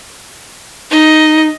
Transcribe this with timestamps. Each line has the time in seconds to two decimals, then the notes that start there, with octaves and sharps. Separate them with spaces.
0.91 D#4 D#5